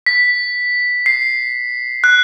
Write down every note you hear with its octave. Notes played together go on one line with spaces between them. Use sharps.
B6
C7
F#6